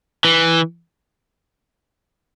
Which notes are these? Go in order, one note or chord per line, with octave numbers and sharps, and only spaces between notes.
E3